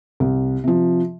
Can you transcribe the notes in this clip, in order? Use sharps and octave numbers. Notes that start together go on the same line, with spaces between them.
C2
C3 F3